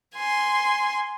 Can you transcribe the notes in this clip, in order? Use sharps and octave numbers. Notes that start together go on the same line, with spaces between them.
G#5 C6